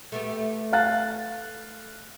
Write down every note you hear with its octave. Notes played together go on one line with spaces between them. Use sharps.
A3 B3 G4
F5 F#6 A6